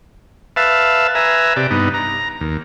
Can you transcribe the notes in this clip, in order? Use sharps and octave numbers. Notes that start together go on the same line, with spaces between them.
B4 E5 F5 A5
B4 E5 G#5 A#5
C3 G4 D5
G2 B3 D#4
A#5
D#2